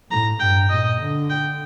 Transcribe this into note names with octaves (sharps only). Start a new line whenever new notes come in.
A2 A#5
G2 G5
A#2 D#5
D3
G5